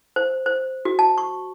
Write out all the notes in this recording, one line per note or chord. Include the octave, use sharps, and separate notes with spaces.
C5
C5
F#4
A5
C#6